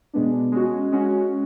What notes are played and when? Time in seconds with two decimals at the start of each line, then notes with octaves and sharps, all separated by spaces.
0.14 B2 G#3 B3 D4
0.52 G#3 C#4 F#4
0.92 G#3 C#4 F#4